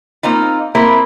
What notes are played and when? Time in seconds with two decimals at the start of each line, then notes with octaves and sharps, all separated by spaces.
0.23 A#3 C4 D#4 F4
0.75 A#3 C4 E4 A#4